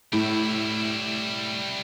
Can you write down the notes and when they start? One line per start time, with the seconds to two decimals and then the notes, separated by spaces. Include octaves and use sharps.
0.13 A2 G3 E4